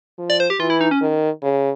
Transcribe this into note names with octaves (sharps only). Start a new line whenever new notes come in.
F3
D5
C5
G4
E3 F4
E4
D#4
C#4
D#3
C#3